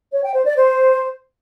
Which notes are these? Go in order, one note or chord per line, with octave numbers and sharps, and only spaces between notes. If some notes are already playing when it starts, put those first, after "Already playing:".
C#5
G5
C5
D5
C5